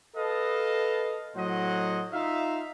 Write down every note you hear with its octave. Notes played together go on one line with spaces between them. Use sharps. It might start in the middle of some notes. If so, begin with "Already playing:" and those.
A4 B4 D#5 F5 A5
A2 F#3 C5 D#5 F#5
D#4 F4 E5 F5